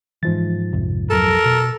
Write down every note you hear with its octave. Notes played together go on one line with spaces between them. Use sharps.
G#2 E3 F3 A6
B1 F2 C3
B1 F2 F#3 A4 A#4
B2